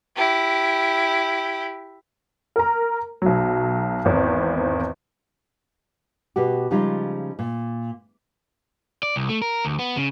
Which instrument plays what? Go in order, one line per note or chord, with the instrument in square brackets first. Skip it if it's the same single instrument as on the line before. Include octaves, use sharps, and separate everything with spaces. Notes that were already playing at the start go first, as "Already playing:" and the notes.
[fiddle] E4 G4
[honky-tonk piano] A#4 A#5
B1 F#3
G#1 E2 C4
[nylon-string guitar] B2 F#4 G4
C#3 F3 G3 G#3 D#4 F4
A#2
[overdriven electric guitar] D5
C2
A3
A#4
D2
B3
C#3